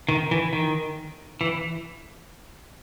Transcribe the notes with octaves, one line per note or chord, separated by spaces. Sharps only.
D#3
E3
D#3
E3